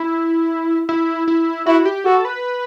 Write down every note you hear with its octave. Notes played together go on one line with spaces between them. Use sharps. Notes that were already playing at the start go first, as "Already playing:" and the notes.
Already playing: E4
E4
E4
E4 F#4
G4
F#4 A4
B4